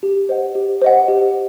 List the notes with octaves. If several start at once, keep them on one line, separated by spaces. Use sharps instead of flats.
G4
C5 D#5 F#5
G4
C5 D#5 F#5
G4